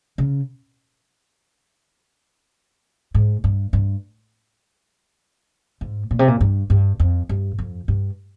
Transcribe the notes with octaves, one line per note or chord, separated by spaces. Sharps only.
C#3
G#2
G2
G2
G#2
A#2
C3
A#2
G2
G2
F2
G2
F2
G2